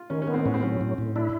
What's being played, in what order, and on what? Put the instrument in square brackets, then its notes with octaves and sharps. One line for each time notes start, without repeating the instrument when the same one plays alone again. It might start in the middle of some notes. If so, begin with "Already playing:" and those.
Already playing: [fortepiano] F4
[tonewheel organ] D#3 [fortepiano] C#4
[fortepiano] C#4
[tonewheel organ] B3
[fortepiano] C4
[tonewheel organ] A2 [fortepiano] C#4
[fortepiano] C4
[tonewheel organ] F#3 [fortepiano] C#4
[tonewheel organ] A2
A2
[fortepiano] D4 [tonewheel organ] E4